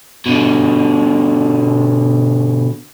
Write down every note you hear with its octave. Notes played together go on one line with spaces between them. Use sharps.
B2 D3